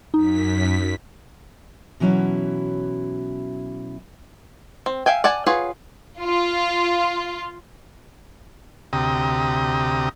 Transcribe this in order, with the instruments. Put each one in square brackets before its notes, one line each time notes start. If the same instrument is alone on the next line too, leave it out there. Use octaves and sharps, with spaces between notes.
[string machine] F#2 B6 [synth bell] D#4
[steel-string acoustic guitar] B2 E3 F#3 C#4 E4
[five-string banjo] C4
E5 F5 G5 G#5
D5 F#5 G#5 A5
F4 G#4 B4 C#5 F#5
[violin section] F4
[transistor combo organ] D2 C3 G4 A#5 D#6